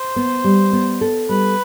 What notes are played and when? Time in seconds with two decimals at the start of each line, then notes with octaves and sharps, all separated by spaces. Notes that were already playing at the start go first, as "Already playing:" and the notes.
Already playing: C5
0.16 B3
0.44 G3
0.73 B3
1.01 A4
1.29 G3 B4